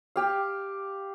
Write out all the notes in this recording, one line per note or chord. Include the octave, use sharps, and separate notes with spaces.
G4 F5